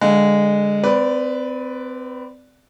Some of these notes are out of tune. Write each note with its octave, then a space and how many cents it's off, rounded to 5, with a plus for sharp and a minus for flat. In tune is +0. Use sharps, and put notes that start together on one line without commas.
D3 +0 G#3 -15 F5 +0
C4 -30 B4 +0 D5 -5